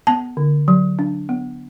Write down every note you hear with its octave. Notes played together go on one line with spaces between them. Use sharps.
B3 A5
D3
F#3
D4
B3